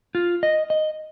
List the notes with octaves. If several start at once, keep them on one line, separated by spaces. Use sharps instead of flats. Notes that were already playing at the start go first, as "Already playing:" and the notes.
F4
D#5
D#5